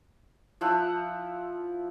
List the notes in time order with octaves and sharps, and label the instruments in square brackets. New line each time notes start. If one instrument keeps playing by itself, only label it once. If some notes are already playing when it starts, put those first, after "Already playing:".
[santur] F3 E4 F#5 E6